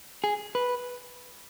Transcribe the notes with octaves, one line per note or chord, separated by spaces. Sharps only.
G#4
B4